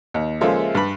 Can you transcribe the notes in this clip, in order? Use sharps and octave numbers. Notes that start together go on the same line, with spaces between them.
D#2
C#3 F3 G#3 A#3 A4 E5
G2 B4 B5